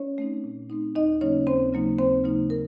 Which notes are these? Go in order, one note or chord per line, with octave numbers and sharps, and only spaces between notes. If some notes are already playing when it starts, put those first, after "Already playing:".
Already playing: C#4 C#5
A3 C4 D#4
A#2
A3 C4 D#4
D#2 D#4 D#5
C#3 F#3 A#3 C#4 D#4 C#5
D#2 C4 C5
C#3 F#3 A#3 D#4
D#2 C4 C5
C#3 F#3 A#3 D#4
A#4